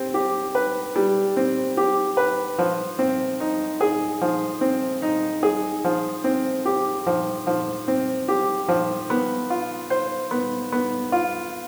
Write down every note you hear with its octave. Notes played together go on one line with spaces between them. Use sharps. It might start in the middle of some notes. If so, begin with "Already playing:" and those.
Already playing: G3 C4
G4
B4
G3
C4
G4
B4
F3
C4
D#4
G#4
F3
C4
D#4
G#4
F3
C4
G4
F3
F3
C4
G4
F3
B3
F4
C5
B3
B3
F4